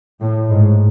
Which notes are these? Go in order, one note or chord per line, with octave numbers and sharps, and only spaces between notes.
A2
G#2